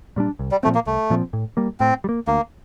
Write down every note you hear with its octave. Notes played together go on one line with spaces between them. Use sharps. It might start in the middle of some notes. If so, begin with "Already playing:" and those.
A#2 G3 D4
C2
G3
A#2 F3 A3 C4
A#3
C2 A3
A#2 F3 C4
A2
G3 A#3
A2 C4
G3
A#3
D2 A#3